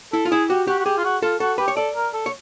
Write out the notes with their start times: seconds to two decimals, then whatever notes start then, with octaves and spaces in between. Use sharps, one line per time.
0.13 E4 A4
0.25 F4
0.31 E4 G#4
0.49 F#4 G4
0.67 F#4 G4
0.79 F#4
0.85 G4 G#4
0.97 F4
1.04 F#4
1.22 F4 A4
1.40 F#4 A4
1.58 G4 B4
1.68 C#5
1.76 A4 D5
1.95 A#4
2.13 A4
2.26 C#5